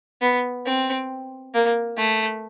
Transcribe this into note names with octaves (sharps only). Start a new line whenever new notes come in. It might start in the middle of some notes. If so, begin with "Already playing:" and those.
B3
C4
A#3
A3